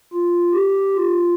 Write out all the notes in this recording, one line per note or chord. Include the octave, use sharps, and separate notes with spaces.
F4
G4
F4